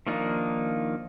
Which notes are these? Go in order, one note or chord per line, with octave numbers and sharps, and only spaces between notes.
D#3 F3 A#3 D4 D#4